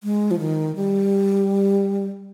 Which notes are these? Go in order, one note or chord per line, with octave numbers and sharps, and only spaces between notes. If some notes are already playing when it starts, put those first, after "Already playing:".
G#3
F3
D#3
G3